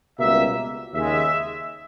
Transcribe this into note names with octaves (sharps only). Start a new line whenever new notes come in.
C#2 B2 G3 A#3 E5
D#2 C#3 G#3 E5